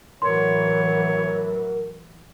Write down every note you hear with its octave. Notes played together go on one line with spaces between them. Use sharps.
A2 E3 F#3 A#4 C#5 C6